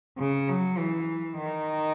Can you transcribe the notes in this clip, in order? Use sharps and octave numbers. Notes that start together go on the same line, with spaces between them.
C#3
F#3
E3
D#3